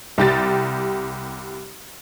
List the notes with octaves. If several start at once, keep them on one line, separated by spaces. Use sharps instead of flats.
C2 G4 A6